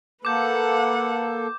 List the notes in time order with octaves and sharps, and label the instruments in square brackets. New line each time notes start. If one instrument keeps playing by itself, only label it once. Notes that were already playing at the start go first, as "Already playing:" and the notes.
[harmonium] A#3 A4 [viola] B4 F#5 [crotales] D6 G6